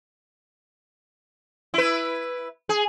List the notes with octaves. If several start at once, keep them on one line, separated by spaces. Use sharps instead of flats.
E4 B4
G#4